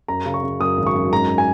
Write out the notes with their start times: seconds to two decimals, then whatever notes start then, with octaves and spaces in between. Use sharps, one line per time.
0.08 F#2 A#5
0.26 C#3
0.34 C#6
0.43 C#3
0.60 F#2 D#6
0.77 G#1
0.87 C#6
0.95 F#2
1.12 G#2 A#5
1.38 G#5